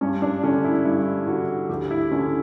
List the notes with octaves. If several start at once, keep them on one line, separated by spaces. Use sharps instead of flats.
G2 C#4
D4
D3 C#4
E4
G2 E4
D3 F#4
D2 G4
E4
D3 C#4